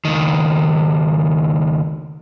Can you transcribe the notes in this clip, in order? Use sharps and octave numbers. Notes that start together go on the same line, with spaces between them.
C#2 D#3